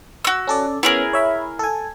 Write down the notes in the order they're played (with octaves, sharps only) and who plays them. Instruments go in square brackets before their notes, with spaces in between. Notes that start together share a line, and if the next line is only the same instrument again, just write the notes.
[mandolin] F#4 E6
[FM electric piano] C#4 A4 D5
[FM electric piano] B3 C#4 [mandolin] E4 G#4 A#4
[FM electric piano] C#5 E5 B5
A4 G#5